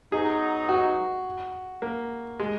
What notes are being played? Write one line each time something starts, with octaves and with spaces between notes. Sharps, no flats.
F#3 B3 D#4 G#4
F#4
A#3
G#3